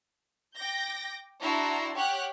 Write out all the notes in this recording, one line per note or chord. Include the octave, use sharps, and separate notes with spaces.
G5 D6 G6 A#6
D4 E4 F#4 A5 A#5 C6
G4 C#5 F#5 G5 F6 F#6